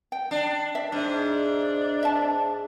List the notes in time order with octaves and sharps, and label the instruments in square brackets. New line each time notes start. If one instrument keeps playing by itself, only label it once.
[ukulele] G5
[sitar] D4
[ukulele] E5
[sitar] G#2 [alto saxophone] D4
[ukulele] E5 A5